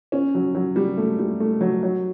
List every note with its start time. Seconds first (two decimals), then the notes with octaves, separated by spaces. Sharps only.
0.12 C#4
0.35 F#3
0.55 F#3
0.76 G3
0.97 A3
1.19 G3
1.40 A3
1.61 F#3
1.83 F#3